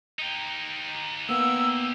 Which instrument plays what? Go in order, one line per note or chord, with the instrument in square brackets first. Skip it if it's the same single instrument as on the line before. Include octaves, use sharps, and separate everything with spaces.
[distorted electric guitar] D#4 G4
[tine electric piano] A#3 B3 [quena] E6